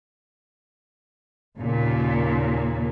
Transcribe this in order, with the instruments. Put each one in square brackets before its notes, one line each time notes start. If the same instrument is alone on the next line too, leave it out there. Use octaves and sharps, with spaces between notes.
[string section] D#2 A#2 C#3